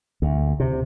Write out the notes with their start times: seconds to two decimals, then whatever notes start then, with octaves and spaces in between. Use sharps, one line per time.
0.22 D2
0.60 C3